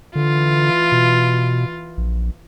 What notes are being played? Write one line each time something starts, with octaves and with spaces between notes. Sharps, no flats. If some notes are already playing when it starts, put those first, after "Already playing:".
D3 E3 F4
B2
A#1